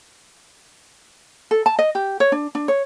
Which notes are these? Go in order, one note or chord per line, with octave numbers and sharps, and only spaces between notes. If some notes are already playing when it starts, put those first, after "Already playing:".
A4
A5
D#5
G4
C#5
D4
D4
C#5